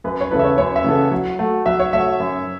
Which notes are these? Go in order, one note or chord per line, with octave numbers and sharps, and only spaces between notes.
F#2 B4
C#5
C#3 E3 B3 A4 B4
E5
C#5
F#2 C#5
E5
C#3 E3 B3 A4
F#3
A3 F#4
F#3 E5
C#5
A3 F#4 E5
F#2